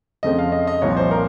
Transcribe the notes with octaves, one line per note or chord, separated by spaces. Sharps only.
F2 C#3 A3 C4 D#5
F5
D#5
D#5
C2 A#2 F3 C4 C#5
C5
A#4